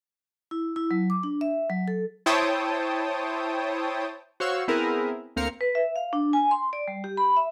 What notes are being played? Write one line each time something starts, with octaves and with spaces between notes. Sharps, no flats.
E4
E4
F#3
D6
D4
E5
F#3
A4
E4 C5 C#5 G5 A5 D#6
F#4 C5 C#5 F5 C#6 E6
B3 C4 E4 G#4 A#4
D2 A#3 C4 A#4 F5 C#7
B4
E5
F5
D4
G#5
C6
D5
G3
G4
B5
E5